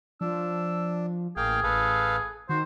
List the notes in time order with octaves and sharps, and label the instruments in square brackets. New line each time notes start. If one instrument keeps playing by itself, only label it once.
[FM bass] F3 [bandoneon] D4 [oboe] E6
[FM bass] A1 [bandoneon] A#3 F5 G5 [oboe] G#4
[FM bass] A1 [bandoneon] A4 B4 F5
[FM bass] D#3 [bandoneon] F#4 [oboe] C5